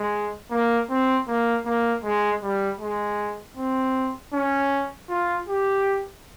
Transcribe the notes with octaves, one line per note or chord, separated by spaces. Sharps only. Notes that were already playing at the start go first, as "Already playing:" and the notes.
Already playing: G#3
A#3
C4
A#3
A#3
G#3
G3
G#3
C4
C#4
F4
G4